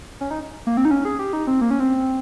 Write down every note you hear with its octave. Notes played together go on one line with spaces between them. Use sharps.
C#4
D#4
A#3
C4
D#4
C#4
G#4
G4
D#4
C4
A#3
C#4
C4